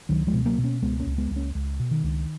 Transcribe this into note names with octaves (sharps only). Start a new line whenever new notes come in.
C#2 D#3 F#3
F3 G#3
B2
F#3 A#3
B2
A#3 C#4
C#2 G#3 B3
A#3 C#4
C#2
G#3 B3
C#2
A#3 C#4
C#2
B2
D#3
C#2